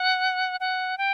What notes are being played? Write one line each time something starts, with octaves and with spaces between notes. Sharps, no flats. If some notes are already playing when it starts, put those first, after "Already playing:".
Already playing: F#5
F#5
G5